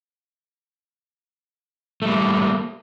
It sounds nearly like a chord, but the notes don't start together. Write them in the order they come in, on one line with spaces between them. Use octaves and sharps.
A3 G3 A#3